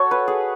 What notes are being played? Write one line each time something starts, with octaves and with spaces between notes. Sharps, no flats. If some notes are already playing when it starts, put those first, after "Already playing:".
Already playing: E4 F#4 A4 C#5
B4
G#4